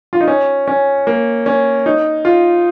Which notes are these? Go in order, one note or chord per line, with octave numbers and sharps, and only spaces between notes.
F4
D#4
C#4
C#4
A#3
C#4
D#4
F4